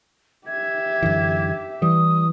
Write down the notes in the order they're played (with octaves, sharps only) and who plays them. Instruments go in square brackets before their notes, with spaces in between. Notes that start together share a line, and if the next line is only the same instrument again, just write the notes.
[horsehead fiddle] G4 E5 [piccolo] G#6
[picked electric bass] F#2 D3 E3
[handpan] E3 [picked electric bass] G3 [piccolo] D#6